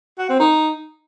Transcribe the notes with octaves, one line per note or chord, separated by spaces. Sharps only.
F#4
C4
D#4